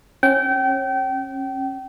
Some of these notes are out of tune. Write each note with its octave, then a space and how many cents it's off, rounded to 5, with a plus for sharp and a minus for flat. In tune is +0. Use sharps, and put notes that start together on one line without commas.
C#4 -30 G5 -30